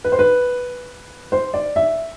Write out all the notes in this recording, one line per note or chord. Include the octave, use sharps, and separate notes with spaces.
B4
C5
B4
C5
D5
E5